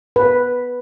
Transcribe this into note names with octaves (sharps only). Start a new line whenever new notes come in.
B4